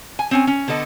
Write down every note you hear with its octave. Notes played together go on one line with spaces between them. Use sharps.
G#5
C4 C#4 G#5
C#4
D3 B3 A4 D#5